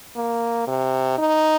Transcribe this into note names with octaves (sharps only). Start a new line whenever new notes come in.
A#3
C3
D#4